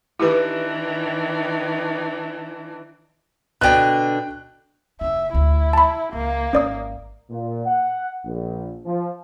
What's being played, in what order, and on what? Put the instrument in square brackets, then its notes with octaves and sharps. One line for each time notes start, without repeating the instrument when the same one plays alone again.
[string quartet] D#3 E3 D4 [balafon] E4 G4 B4
[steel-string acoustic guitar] B2 D3 D4 [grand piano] G5 F#6
[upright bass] F1 D#4 [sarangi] E5
[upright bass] F1 D2 [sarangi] E4
[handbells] A5 B5
[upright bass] C#2 [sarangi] A#3
[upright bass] G#1 [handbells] C#4 D5 D#6
[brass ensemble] A#2
F#5
A#1
F3